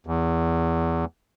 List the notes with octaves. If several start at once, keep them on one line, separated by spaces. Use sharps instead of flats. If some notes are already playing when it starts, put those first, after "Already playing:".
E2